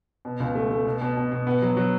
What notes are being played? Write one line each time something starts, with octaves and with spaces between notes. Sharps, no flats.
B2
C#2
A3
A3
B2
B2
B2
B2
B3
F#3
F#3